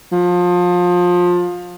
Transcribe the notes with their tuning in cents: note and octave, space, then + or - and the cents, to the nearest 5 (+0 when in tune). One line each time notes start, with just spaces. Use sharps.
F3 +25